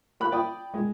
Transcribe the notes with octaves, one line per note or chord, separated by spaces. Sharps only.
A#3 B5 F#6
D5 G5 B5 D#6
G#3